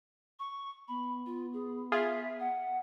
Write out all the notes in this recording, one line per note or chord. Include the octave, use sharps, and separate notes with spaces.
C#6
B3 B5
F4
G#4
F4 G#4 E5
F#5